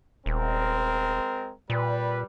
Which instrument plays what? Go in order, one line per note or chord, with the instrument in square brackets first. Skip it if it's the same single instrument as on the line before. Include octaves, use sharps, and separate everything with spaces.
[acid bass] D#1 [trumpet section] G#3 C4 A#4
[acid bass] A#2 [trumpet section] G3 B4